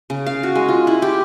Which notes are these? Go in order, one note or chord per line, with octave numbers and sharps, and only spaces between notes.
C#3
F5
F#4
G#3
F4
E4
G4